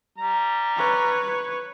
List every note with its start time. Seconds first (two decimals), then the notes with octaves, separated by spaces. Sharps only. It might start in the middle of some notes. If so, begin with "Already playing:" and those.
0.18 G3 A#5
0.76 B4 C#5